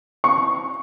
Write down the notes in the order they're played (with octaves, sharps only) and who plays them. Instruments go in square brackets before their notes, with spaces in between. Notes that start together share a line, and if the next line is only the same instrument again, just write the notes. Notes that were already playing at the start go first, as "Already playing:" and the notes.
[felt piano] C#6